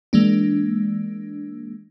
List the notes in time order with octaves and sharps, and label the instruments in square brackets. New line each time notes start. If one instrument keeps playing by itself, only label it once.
[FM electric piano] E3 G#3 A#3 D4